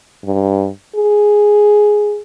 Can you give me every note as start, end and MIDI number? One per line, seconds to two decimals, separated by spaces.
0.25 0.69 43
0.96 2.21 68